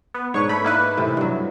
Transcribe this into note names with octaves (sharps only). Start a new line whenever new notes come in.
B3
G#2 D4 B4 C#5 C#6
A3 B5
A#3 D#4 E4 B4
A2 C3 E3
G2 F#3